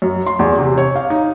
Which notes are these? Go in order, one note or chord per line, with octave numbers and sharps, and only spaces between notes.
F#2
C6
E2
C3
C#5
F5
D#4